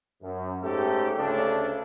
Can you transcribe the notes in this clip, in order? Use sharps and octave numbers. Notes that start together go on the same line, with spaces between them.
F#2
G#2 A3 C#4 G4 A4
D2 C#3 A3 D4 A4